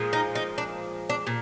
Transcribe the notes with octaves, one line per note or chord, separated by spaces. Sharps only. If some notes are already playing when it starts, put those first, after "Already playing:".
Already playing: A#2 F3 G#3
D#4
D#4
D4
D4
A#2